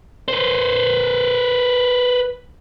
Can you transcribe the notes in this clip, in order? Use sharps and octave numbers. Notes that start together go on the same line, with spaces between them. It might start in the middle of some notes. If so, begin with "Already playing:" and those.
B4 C5